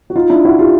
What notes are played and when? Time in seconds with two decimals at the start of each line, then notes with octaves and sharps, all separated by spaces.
0.10 F#4
0.15 D#4 F4
0.30 D4 E4
0.44 E4 F#4
0.59 F4 G4